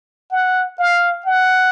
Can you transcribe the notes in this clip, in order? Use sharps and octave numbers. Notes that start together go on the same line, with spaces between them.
F#5
F5
F#5